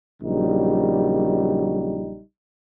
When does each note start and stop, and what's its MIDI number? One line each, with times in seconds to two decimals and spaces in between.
0.23 2.22 34
0.23 2.22 49
0.23 2.22 54
0.23 2.22 55
0.23 2.22 63